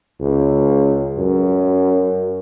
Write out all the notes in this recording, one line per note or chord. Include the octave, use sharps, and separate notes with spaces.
C#2
F#2